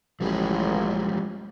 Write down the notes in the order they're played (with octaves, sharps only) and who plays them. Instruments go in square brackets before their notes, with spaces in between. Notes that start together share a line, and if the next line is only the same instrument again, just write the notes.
[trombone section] A1 [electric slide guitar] F3 G3 G#3